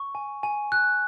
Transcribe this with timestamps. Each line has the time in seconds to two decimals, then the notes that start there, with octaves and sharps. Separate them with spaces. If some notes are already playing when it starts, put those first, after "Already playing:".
Already playing: C#6
0.15 G#5
0.43 G#5
0.72 F#6